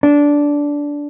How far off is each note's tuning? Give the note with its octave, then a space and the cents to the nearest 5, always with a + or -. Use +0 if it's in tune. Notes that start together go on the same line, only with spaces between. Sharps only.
D4 -15